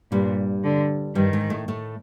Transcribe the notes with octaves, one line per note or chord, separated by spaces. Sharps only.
G2 A#2 G3
D3
G2 D#3 G3
G#2 G#3
A2 A3
A2 A3